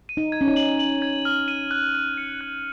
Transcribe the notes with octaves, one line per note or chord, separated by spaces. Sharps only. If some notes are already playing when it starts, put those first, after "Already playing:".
D#7
D#4
G#6
C#4
D#4
F#7
F#7
G#6
F6
D#7
F#6
F#6
C#7
F#6